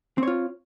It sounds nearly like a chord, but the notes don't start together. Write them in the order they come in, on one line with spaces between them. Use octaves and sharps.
C4 C#5 F4